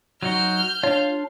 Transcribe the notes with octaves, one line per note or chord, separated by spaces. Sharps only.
F#3 D#4 F#4 F6 G6
D4 F4 C#5 F5